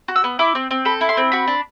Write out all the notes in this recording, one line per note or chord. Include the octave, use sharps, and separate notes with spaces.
F#4
E6
B3
E4 D6
C4
C4
A4 B5
E4
C6
C4
F#4 B5
D4